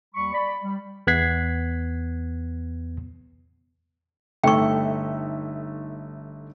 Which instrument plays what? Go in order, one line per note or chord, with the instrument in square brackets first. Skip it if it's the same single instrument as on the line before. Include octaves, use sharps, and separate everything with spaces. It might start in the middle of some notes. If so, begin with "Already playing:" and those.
[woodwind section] D#2 G3 B5 C#6
D5 B5
G3
[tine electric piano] E2 B3 F#6 G#6 B6 C7
[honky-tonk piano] G1 D#4 E5 [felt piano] A3 [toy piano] G5 C#6